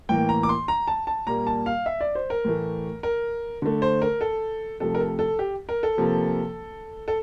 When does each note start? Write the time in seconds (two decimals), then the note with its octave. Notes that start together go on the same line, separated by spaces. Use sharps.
0.09 A2 E3 A#3 G5
0.29 A#5
0.43 D6
0.49 C6
0.68 A#5
0.88 A5
1.07 A5
1.27 A#2 G3 A#3 A#5
1.47 A5
1.66 F5
1.86 E5
2.01 D5
2.15 C5
2.30 A#4
2.45 A2 E3 A3
3.03 A#4
3.62 D3 A3
3.82 C5
4.02 A#4
4.21 A4
4.80 C3 F3 A3 A4
4.95 A#4
5.00 A4
5.19 A4
5.39 G4
5.69 A#4
5.83 A4
5.98 C3 F3 A#3
7.08 A4